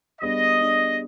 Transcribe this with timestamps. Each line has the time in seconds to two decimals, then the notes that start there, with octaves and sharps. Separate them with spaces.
0.21 G3 B3 D4 G#4 D5 D#5
0.59 G3 B3 D4 G#4 D5